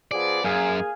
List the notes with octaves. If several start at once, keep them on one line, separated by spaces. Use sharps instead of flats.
F3 B3 G#4 D5
F#2 A#3 G#4 F5 G#5